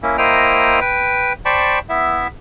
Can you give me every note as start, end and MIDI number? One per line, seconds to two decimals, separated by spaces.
0.03 0.17 58
0.03 0.17 61
0.03 0.17 64
0.18 0.80 58
0.18 0.80 64
0.18 0.80 72
0.18 0.80 75
0.18 0.80 79
0.18 0.80 82
0.81 1.33 71
0.81 1.33 79
1.45 1.79 72
1.45 1.79 74
1.45 1.79 79
1.45 1.79 81
1.45 1.79 83
1.45 1.79 85
1.89 2.27 59
1.89 2.27 64
1.89 2.27 76